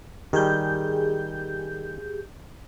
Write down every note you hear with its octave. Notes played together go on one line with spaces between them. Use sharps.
D#3 G3 G4 G#4 G6